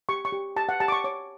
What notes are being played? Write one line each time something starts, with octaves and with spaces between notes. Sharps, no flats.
G4 C#6
C#6
G4
G4 A5
F#5
G4 A5
D6
C#6
C#5 D6